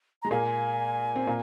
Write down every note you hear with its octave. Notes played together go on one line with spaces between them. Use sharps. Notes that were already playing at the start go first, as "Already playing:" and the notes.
G#3 A#5
A#2 A#3 G#5
C4
A#2 A#3